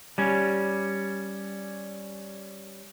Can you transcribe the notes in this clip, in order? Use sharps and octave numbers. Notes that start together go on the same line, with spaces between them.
G3 C#4